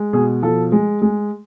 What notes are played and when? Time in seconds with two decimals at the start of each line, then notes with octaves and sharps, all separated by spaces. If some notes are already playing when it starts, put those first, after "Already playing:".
Already playing: G#3
0.13 B2 G#4
0.42 F3 A4
0.72 G#3
1.02 G#3